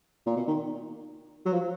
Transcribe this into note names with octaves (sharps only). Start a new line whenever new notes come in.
A#2
B2
D#3
F#3
F3